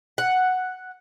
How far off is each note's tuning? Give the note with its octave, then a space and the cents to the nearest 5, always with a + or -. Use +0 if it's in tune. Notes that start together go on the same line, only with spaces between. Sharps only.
F#5 +0